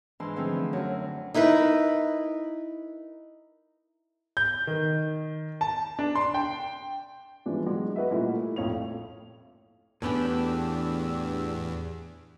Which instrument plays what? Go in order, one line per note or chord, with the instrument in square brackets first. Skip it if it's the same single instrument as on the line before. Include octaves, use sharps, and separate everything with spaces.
[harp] G#2 E3 D4 A5 C6
D3 E3 F3 A3 C4 G#4
F4 E5
F#2 A2
[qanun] D#4 E4 A#4 B4
[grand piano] G6
D#3
A5
D4
C6
G5
[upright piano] E3 F3 G3 G#3 C#4 D4
F#3 G#3
F#4 B4 D#5 E5
A#2 G3 A3 C#4 E4
E4
A#1 F2 A2 C#5 F5 F7
[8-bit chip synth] E2 [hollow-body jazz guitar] A2 B3 C#4 [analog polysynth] D4 G4 E6